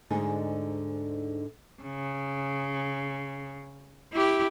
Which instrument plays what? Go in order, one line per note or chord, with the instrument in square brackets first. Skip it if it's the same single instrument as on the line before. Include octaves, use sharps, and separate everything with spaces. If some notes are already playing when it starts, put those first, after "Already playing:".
[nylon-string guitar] D2 G#2 D3 D#4 G#4
[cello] C#3
E4 G4